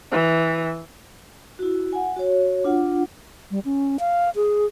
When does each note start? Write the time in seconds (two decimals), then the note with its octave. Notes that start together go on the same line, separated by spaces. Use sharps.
0.13 E3
1.59 E4 F#4
1.93 F#5 G#5
2.16 F#4 C#5
2.64 D4 F4 F#5
3.51 G3
3.65 C#4
3.99 F5
4.36 G#4